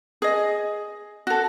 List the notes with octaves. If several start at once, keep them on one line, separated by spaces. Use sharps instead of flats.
G#4 D#5
F#4 A4